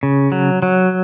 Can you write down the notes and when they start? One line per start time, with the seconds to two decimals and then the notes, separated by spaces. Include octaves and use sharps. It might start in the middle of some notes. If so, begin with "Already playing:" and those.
0.03 C#3
0.32 F#3
0.62 F#3